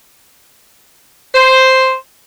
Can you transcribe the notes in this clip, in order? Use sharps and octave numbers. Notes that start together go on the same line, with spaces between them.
C5